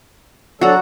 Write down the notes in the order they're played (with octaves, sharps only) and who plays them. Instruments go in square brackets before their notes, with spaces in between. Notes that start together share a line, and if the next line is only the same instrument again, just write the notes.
[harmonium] F#3 D4 A4 [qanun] F#4 A#5